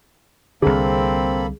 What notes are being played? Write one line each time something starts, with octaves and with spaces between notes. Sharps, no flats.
C2 D3 A#3 C4 G#4 A4 B5